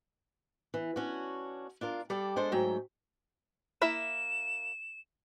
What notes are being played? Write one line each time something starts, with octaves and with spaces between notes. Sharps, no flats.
E3
C#4 D4 F#4
D4 F4 A#4
G3 A4 D5 G5
G#3 D4 A4 C5
G#2 F#3 A3 G5
A#3 E4 E5 E7